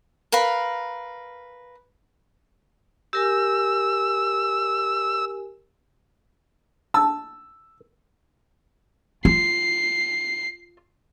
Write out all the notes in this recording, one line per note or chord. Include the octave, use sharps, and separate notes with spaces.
A#4 B4 F5 B5
G4 A#4 G#5 E6
A5 E6
F4 C7